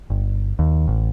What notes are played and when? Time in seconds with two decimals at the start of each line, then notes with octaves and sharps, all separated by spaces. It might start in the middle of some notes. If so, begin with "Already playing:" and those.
0.10 G1
0.59 D#2
0.88 A1